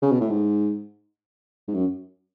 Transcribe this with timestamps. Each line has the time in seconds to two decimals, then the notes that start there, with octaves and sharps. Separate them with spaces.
0.03 C#3
0.12 B2
0.21 A2
0.30 G#2
1.68 G#2
1.74 F#2